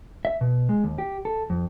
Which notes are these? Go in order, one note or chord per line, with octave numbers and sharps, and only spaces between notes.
E5
B2
G#3
D#2
G4
A4
F2